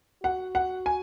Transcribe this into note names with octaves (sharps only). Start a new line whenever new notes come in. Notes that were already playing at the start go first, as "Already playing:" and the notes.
F#4 F#5
F#5
G#5